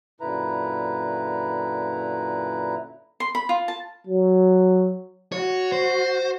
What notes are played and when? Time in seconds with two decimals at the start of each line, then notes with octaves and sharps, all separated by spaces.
0.21 F#2 A#2 D3 E4 B4 A#5
3.20 C6
3.35 B5
3.49 F4
3.68 A5
4.07 F#3
5.32 F#4 C#5
5.72 C5